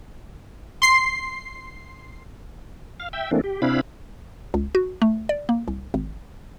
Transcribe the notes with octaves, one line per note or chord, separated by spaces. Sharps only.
C6 C7
F5
E5 G5
E3 A3 A#3 C4 D4
G4
C3 C4 D4 E4 F5 B5
C#2
F#4
A3
D5
A#3
C2
G#1